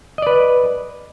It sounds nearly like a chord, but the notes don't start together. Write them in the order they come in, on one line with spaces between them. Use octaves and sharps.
D#5 D5 B4